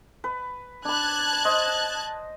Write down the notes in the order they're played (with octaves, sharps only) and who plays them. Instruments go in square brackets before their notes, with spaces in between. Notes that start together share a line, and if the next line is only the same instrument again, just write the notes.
[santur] B4
[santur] D4 B5 [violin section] A5 F#6 G#6
[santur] C5 D#5